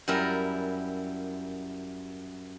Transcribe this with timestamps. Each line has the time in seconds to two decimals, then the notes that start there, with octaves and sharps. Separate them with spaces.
0.08 F#2 G3 E4 A#4